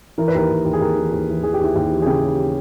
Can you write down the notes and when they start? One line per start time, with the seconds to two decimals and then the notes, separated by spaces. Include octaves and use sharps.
0.18 E3 A#4
0.28 B4
0.35 D#2 A#4
0.49 D#2
0.65 D#2
0.73 G#4
0.81 D#2 A#4
0.97 E3
1.12 D#2
1.28 E3
1.43 E3 G#4
1.54 G4
1.59 D#2 E4
1.74 D#2 G4
1.91 E3
2.02 G#4
2.06 C#3 G4
2.22 D#2